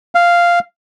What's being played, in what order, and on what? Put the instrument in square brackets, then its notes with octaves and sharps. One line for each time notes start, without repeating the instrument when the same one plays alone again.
[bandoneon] F5